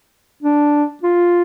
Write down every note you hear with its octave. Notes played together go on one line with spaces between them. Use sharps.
D4
F4